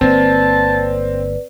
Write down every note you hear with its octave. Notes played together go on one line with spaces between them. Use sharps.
G1 D3 A#3 C4 B4 D5 A5